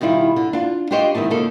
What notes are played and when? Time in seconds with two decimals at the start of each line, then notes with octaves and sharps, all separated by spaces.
0.01 B2 D#3 G3 E4 F4
0.36 D3
0.53 D4 F4
0.91 D4 F4 G4 C5 C#5 D#5
1.15 G#2 D#3 C4 E4 A5
1.30 C#3 A#3 D#4 F4 A4